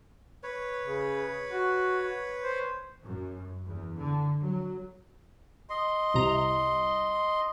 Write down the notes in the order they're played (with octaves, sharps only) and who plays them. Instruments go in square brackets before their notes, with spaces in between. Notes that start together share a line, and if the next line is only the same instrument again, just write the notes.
[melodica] B4 C#5
[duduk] C#3
F#4
C5
[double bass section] F#2
E2
D3
F#3
[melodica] D#5 C6
[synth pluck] C2 C3 A#5